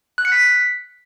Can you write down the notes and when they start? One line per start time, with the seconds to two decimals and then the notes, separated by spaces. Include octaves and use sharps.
0.18 F#6
0.25 C#7
0.32 B6